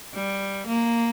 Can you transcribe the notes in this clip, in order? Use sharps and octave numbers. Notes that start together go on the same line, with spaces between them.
G3
A#3